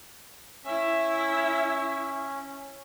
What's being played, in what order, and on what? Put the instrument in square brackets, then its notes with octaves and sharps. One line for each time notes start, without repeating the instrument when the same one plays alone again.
[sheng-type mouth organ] C#4 [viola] E4 E5